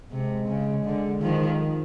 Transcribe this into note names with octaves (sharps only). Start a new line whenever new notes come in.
C3 G#3
C#3
D3
D#3 F3